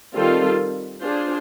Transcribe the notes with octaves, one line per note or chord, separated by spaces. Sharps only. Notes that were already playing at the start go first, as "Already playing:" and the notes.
D#3 G3 C4 F4 A4
D4 F4 G#4 C5